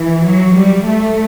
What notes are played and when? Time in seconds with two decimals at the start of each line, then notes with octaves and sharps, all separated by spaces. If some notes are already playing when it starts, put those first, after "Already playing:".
Already playing: E3
0.26 F#3
0.56 G3
0.86 A3